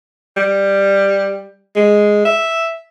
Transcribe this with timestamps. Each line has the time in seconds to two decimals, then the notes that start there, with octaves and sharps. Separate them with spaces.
0.37 G3
1.76 G#3
2.25 E5